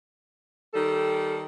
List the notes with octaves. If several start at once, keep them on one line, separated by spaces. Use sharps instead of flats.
D#3 G3 A4